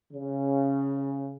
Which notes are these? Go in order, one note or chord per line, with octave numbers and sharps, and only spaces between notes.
C#3